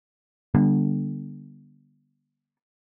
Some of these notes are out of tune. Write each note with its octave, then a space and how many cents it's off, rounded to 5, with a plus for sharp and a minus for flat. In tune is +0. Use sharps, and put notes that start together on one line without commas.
D3 +0 G3 +0 B3 -35